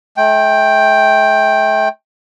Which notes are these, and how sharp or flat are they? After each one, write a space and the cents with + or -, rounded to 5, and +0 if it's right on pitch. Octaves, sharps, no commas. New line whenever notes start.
A3 -35 G5 +5